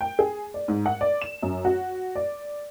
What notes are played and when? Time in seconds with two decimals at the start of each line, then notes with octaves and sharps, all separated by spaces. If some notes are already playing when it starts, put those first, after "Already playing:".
0.01 G5
0.19 G#4
0.54 D5
0.68 G#2
0.86 F#5
1.01 D5
1.22 E7
1.43 F#2
1.65 F#4
2.15 D5